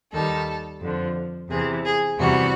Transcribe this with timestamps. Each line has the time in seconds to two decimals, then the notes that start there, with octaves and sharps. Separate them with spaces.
0.12 D#2 D#3 G3 A4
0.81 F2 D3 F3
1.50 E2 C3 E3 G#4
1.85 G#4
2.19 E2 C3 E3 G3 F#4